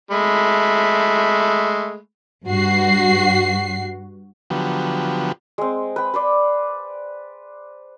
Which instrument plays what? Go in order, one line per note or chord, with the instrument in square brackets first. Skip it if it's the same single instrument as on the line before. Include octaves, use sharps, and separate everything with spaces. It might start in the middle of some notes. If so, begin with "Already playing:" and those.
[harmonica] G#3 A3 B5
[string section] G2 F#4 C7
[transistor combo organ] D3 F3 F#3 B3 G4
[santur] G#3 C4
B4 G5
B4 C5 D5